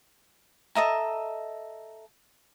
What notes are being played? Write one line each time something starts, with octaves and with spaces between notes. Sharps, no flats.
A4 D#5 E5 A#5